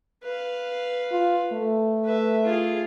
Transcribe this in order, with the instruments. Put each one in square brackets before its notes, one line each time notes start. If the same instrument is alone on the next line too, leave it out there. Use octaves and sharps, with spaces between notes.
[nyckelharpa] B4 F5
[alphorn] F4
A3
[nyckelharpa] B4 E5
F4 G#4